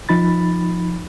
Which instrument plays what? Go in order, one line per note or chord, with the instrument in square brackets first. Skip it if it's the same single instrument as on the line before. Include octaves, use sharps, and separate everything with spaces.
[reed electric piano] F3 D#4 B5 A6